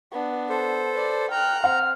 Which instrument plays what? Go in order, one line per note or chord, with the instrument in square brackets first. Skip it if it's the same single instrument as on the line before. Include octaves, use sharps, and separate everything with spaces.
[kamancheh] B3 D4
[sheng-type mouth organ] A4 C5
[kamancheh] B4 D5
[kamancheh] G5 F#6 [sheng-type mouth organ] A#5 [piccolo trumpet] F6
[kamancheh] C4 [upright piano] F#5 [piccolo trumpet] F6